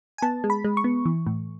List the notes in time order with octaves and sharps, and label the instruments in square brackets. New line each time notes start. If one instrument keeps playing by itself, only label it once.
[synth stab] G#5
B3 A5
G#3
B5
G#3
C#6
B3
E3
A2